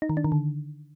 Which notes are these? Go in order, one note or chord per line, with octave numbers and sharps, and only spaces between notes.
D#4
D#3
D4
D#3
D3